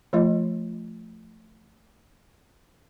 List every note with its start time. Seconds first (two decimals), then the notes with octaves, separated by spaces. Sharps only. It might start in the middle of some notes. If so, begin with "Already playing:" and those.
0.13 F3 A3 F4 D#5